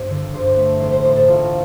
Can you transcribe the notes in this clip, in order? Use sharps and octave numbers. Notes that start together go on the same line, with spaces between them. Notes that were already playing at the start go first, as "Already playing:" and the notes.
Already playing: G2 C4
D3
G2 C5
A3
A1 C5
C5
A2 C5
A4
A1 F4